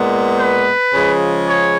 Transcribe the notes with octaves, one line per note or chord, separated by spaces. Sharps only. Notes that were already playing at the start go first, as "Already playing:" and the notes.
Already playing: A#2 G#3 B3
B4
C#3 F3 G#3
C#5